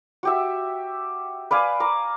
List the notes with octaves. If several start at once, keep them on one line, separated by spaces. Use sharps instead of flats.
F#4 G4 E5
B4 D5 F5 G#5
A#5 D6